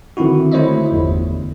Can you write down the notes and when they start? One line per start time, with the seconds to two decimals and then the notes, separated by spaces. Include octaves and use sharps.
0.17 D3 D#3 C4 E4 F#4
0.52 A3 E4 C5 C#5 D#5 E5
0.92 G1 E2